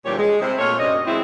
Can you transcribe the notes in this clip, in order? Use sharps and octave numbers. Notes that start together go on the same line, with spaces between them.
D2 A#2 E3 G3 G4 C#5
G#3
C3 E4 C5
A#2 A3 F4 C#5
F#2 C3 D4 D#5
E3 F#3 G#3 C4 E4